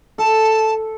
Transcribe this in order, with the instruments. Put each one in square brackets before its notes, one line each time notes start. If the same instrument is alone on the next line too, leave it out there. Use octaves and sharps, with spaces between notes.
[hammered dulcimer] A4 [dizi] A5